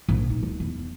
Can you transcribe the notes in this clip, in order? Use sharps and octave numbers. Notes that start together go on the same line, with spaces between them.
A#1
D#4
D#2
E2